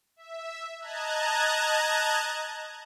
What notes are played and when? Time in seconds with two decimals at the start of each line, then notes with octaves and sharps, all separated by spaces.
0.16 E5
0.79 D#5 A5 A#5 F#6 G#6